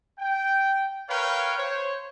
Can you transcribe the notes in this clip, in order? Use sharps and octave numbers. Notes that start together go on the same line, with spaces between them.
G5
A#4 B4 C#5 F5 G5
C5 C#5